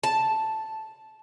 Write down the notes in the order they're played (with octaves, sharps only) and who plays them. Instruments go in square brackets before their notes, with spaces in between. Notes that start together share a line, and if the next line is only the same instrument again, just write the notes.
[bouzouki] A5